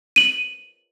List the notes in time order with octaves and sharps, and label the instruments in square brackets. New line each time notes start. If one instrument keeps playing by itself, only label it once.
[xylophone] D#7 F#7